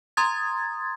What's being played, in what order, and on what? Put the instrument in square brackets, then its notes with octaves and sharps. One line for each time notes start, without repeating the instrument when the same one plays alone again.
[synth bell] A#5 C6 D#6 G#6 A6